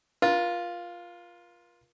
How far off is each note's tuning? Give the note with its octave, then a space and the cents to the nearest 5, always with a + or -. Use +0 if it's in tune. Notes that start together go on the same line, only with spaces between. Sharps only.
F4 +0 A#4 +45